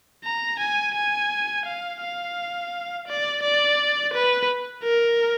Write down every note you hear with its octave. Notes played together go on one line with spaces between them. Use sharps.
A#5
G#5
G#5
F5
F5
D5
D5
B4
A#4